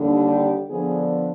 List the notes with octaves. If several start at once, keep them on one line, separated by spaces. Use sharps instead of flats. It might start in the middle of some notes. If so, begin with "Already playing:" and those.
Already playing: D#2 D3 G3 D4
G4
D3 F3 B3 D4 G#4